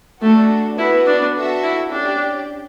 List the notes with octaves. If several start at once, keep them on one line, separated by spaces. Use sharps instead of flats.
A3 D4 F#4 A4
B3 E4 F#4 B4
D4
F#4 A4 E5
E4
C#4 D4 G4 D5